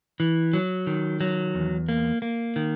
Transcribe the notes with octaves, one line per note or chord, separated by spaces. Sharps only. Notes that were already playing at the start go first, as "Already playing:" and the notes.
E3
F#3
D#3
F#3
E2
A#3
A#3
D#3